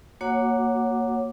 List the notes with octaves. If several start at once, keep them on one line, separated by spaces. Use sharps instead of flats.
A#3 F#4 C#5 F#5 D6